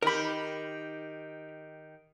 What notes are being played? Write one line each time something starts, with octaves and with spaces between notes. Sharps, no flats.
D#3 G4 A#4 B5